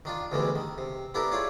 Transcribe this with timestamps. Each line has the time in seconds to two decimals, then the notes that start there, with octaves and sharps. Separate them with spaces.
0.05 D#3 D4 F4
0.32 D2 B2 D3 E3 G3 G#3
0.55 D#3
0.78 C3
1.14 B3 D4 E4 G4 A4 A#4
1.31 E4 F4 G#4 C#5 D5